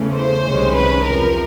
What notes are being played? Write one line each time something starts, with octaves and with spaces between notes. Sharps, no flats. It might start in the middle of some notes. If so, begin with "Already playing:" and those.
Already playing: E2 C#3 E3 A3
C5
C2 C3 D#3 G#3 C#4
B4
E2 C3 F3 A#4